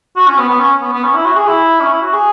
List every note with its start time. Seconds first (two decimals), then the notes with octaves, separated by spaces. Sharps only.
0.17 F#4
0.28 C#4
0.38 B3
0.50 B3
0.60 C#4
0.82 B3
0.93 B3
1.03 C#4
1.15 E4
1.26 F#4
1.37 G#4
1.48 E4
1.80 C#4
1.91 E4
2.02 F#4
2.13 G#4